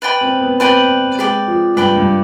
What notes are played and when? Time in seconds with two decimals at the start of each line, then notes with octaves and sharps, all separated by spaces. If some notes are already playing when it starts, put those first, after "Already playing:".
0.02 B4 D5 G5 B5
0.21 C4
0.40 B3
0.60 C4 B4 D5 G5 B5
1.19 G#3 B4 D5 G5 B5
1.48 F3
1.77 G2 B4 D5 G5 B5
1.96 G2